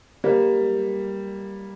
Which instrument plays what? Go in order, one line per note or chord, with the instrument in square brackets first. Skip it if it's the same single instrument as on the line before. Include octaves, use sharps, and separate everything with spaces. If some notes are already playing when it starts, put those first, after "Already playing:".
[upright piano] G3 A#3